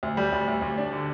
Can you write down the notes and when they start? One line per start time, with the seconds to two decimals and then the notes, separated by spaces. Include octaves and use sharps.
0.03 D2
0.17 G3
0.32 D2
0.48 D2
0.62 D2
0.78 D4
0.93 D3